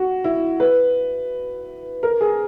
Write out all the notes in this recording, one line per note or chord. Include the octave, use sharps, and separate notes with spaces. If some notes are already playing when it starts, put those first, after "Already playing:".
Already playing: F#4
E4
B4
A#4
G#4